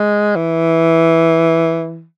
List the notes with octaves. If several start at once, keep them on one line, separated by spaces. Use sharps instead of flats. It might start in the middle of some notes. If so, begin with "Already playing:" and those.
Already playing: G#3
E3